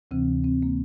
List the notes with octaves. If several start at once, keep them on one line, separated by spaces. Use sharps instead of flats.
D2 C3 E3 C4
C4
A#3